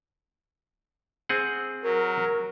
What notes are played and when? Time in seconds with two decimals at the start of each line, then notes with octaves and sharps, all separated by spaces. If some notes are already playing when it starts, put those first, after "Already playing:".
1.29 C4 G#4 F#5
1.83 F#3 A#4